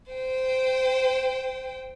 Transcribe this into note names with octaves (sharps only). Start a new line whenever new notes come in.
C5 G5